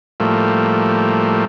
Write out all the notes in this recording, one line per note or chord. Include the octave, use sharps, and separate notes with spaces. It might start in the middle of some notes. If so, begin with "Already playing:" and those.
A2 F3 G3 A3 A#3